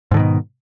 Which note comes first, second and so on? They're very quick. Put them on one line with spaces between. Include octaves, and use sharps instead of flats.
G#2 D3 D#3 B2